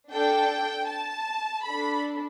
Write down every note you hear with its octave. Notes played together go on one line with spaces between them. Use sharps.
D4 A4 G5
A5
D4 A4 B5